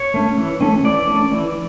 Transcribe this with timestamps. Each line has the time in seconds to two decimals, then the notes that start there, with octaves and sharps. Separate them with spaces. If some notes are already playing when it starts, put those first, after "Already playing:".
Already playing: C#5
0.14 A3 C#4
0.38 E3
0.61 A3 C#4
0.84 E3 D5
1.08 A3 C#4
1.32 E3